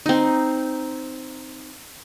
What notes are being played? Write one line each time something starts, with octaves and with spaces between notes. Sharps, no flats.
C4 D#4